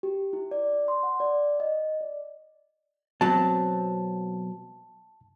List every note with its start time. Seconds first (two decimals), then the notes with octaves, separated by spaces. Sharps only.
0.03 G4
0.33 E4
0.51 D5
0.88 C6
1.03 F#5
1.20 D5
1.60 D#5
2.01 D5
3.21 B2 F#3 C4 A5